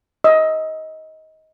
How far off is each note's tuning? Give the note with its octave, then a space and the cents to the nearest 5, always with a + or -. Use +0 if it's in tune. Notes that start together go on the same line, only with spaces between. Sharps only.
D#5 +20 E6 +0